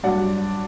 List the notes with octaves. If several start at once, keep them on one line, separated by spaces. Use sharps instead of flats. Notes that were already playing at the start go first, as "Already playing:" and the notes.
G2 F#3 D5 F#5